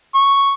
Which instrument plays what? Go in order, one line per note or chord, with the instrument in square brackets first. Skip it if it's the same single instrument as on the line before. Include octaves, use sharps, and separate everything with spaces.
[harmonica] C#6